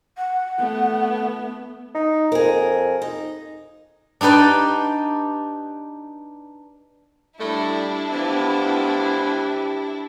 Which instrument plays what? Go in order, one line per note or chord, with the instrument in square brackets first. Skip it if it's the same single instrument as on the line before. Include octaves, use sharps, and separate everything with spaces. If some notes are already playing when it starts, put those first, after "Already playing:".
[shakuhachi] F#5
[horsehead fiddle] A3 B3
[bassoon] D#4
[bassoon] F2 [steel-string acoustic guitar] G#4 A#4
[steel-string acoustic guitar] D#4
[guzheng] D4 D#4 G4 B4 D5
[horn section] A2 A3 [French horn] G3 [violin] D4 E4
[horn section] A2 E3 F3 [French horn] B3 [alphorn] G4